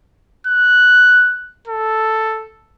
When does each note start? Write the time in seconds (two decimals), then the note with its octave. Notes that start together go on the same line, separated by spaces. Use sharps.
0.47 F#6
1.68 A4